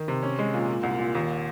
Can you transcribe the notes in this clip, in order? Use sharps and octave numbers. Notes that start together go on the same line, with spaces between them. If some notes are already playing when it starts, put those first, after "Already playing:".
Already playing: D#3
C3
C#4
G#3
A#2
A#2
C2
A#2
D#2